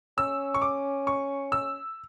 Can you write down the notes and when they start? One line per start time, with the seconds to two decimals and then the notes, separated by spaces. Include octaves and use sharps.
0.18 C#4 E6
0.54 C#6
0.62 D6
1.07 C#6
1.52 E6